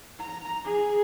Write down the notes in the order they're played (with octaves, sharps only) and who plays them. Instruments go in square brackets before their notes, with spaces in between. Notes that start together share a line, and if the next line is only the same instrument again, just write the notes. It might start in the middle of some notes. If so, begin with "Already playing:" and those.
[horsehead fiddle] A#5
G#4